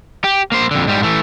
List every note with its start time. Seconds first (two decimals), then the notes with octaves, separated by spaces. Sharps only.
0.24 G4
0.52 A#3 C5
0.71 F2 D3
0.87 G#2 G3
1.03 E3 A3